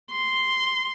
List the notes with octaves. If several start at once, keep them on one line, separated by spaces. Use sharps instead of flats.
C6